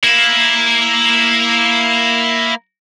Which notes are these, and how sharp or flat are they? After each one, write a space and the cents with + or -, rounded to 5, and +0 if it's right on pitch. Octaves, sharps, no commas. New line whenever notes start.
A#3 +0 E4 +0